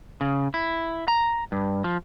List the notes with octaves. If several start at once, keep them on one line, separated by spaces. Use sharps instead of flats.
C#3
E4
A#5
G2
F3